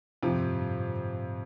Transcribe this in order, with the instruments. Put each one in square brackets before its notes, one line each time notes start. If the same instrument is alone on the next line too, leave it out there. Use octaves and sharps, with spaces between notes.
[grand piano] F2 C3 F3 [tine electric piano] A2
[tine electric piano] G2
A2
G2
A2